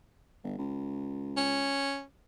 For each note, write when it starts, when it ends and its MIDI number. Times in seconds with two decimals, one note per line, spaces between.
0.43 0.55 31
0.58 1.81 37
1.37 2.03 61